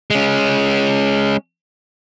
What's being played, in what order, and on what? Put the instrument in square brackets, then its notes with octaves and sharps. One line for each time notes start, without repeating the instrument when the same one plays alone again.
[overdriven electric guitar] G#3 C#4